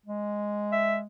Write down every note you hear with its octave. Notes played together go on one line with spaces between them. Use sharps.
G#3
E5